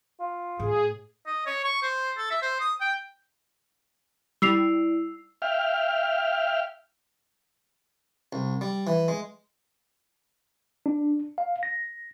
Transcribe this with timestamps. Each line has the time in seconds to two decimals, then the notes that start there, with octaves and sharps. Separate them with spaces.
0.20 F4
0.59 A2 G#4
1.27 D#5
1.46 C#5
1.64 C#6
1.83 C5
2.17 A4
2.31 E5
2.42 C5
2.60 D#6
2.81 G5
4.42 G3 E4 D5 E6 C7 F7
5.42 E5 F5 G5 F6
8.33 C2
8.61 G3
8.87 E3
9.08 G#3
10.86 D4
11.38 F5
11.63 A#6